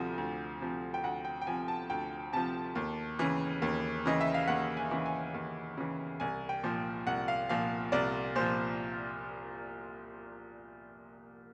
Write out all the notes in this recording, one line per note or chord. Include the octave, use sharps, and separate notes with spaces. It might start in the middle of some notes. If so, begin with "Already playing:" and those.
Already playing: D2 C3 F3
D2
C3 F3
G5
D2 F#5
G5
G5
C3 F3 G#5
A5
D2 G5
C3 F3 A5
D#2
C#3 E3
D#2
C#3 E3 D#5
E5
F5
D#2 F#5
G#5
C#3 E3
G#5
D#2
C#3 E3
C2 G#5
G5
A#2 F3
C2 F#5
F5
A#2 F3 F5
C2 D5
A#2 F3 C5